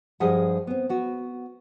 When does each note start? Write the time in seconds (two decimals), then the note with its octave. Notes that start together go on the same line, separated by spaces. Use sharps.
0.20 G2 F3 G3 G#4 D#5 F#5
0.67 B3 C4
0.89 B3 F#4